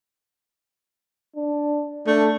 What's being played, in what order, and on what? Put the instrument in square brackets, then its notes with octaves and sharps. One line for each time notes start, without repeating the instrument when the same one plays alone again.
[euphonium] D4
[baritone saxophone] A3 [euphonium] D4